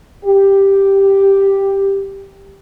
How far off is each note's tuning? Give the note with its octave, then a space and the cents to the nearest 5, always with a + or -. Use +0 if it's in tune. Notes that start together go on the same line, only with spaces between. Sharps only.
G4 +0